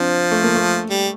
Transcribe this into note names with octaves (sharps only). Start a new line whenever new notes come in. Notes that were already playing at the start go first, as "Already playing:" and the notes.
Already playing: F3 C4 D4
A3
A#3
A3
G3